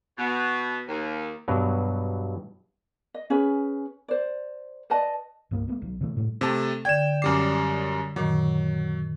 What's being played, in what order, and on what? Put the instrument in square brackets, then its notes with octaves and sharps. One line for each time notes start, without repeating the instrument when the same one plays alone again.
[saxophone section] B2
D#2
[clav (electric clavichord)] G2 B2 F#3
[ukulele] D#5
C#4 G#4 B4
C5 D5
B4 D5 D#5 A5
[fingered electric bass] C2 G2 A#3
G#3 A3 B3
B1 F#3
C3 E3 F#3 A3
A2 G3 A3
[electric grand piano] C3 A3 A5
[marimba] D3 D5 G#6 [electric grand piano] G5 E7
[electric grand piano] F#2 G3 C7 [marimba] D6
[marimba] F#2 A#2 D#3 [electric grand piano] F#3